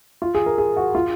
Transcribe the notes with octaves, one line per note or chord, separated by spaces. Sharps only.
F4
G#4
A#4
G#4
F#4
F4